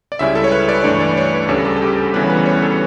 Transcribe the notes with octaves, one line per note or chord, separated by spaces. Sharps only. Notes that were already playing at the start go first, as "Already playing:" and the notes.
D5
C#2 C#3 G3 C#4 E4 E5
A4
C#5
B4
D5
G2 E3 A3 D4 C#5
D5
C#5
B4
D2 C#3 G3 A4
A4
A4
G4
A4
D2 C#3 E3 G3 B3 B4
C#5
B4
C#5
A4